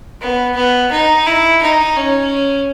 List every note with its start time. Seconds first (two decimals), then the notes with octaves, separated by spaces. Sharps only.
0.21 B3
0.56 B3
0.91 D#4
1.26 E4
1.62 D#4
1.97 C#4